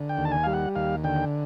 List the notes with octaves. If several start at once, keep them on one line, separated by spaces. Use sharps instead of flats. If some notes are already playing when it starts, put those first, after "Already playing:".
Already playing: D3
G5
D#2
A5
G#5
G3 F5
F#5
D#2 F5
D3 G5